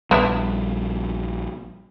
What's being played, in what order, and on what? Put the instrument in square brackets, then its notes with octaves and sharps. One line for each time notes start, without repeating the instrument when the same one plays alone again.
[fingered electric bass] A#1 G3 [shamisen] B3 D4 E5